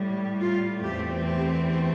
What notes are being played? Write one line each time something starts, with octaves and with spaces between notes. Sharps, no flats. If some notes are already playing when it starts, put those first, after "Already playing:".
Already playing: A2 G3
F4
E2 E3 A3 C4 G4
G4